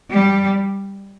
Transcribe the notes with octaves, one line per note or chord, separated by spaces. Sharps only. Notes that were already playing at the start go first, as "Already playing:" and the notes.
G3